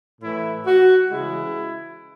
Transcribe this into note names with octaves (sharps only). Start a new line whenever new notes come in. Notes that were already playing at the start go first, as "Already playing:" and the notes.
A2 E3 A3 E4
F#4
C#3 E3 G#3 E4